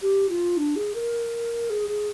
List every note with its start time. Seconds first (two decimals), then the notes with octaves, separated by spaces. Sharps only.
0.02 G4
0.29 F4
0.57 D4
0.76 G#4
0.95 A#4
1.70 G#4
1.89 G#4